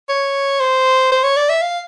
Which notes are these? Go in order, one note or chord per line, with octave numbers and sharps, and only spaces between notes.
C#5
C5
C5
C#5
D5
E5
F5